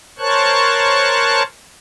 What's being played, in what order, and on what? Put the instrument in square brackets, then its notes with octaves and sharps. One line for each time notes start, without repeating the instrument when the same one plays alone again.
[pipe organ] A#4 C5 C#5 A5 C#6 F#6